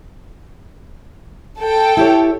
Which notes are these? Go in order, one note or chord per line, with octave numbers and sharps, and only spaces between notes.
A4 G5
E4 G4 C#5